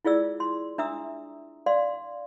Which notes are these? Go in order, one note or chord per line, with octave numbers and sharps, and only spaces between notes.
E4 F4 G#4 D5 E6
C6
D4 E5 A#5 D#6 E6
D5 F5 C6